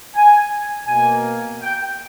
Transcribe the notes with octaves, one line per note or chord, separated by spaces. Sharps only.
G#5
B2 A#3 G#5
G5